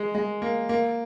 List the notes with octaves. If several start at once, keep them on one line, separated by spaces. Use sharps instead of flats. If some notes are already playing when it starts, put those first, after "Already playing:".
Already playing: G#3
G#3
A#3
A#3